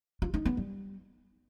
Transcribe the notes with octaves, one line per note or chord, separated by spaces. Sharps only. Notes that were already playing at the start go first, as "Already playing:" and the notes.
F4
D#4
B3
G3